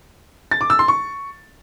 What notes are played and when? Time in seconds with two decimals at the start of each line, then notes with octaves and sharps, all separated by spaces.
0.51 A6
0.61 D6
0.70 E6
0.79 C6
0.88 C#6